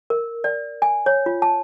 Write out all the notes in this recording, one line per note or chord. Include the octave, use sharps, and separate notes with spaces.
A#4
D5
G#5
C#5
F4
A5